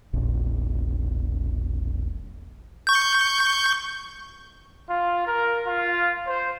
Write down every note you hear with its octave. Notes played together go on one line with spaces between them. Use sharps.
E1 A#1
C#6 G6
F4
A#4
F4
C5